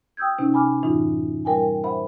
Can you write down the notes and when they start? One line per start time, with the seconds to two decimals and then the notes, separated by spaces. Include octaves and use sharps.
0.17 G5 D#6 E6 G6 G#6
0.38 C3 C#4 D#4
0.54 G#5 B5 D6 F6
0.83 F#2 A2 E3 D#4 F4
1.45 G3 A#4 G5 G#5
1.84 C5 E5 F#5 B5